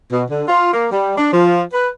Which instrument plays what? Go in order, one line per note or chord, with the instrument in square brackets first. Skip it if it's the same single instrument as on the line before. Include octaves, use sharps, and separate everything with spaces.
[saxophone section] B2
D3
F4
A#3
G3
D4
F3
B4